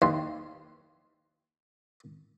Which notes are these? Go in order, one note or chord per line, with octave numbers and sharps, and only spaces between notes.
D#2 C6